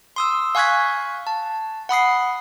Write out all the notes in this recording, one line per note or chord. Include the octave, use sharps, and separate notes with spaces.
C6 D#6 E6
F5 G#5 C#6 F#6 G#6 B6
A5
F#5 B5 D#6 C7